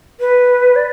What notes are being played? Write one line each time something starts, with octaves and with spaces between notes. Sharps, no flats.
B4
D5